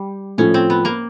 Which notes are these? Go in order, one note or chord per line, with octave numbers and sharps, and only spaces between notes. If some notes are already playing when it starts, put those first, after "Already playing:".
Already playing: G3
A2 F3 A3 C#4
C4
B3
A#3